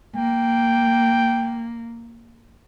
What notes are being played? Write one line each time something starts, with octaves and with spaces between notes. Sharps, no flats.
A#3 G5